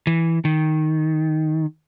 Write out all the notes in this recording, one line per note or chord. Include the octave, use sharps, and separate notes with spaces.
E3
D#3